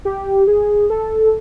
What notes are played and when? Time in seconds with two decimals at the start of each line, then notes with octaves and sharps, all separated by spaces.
0.05 G4
0.47 G#4
0.90 A4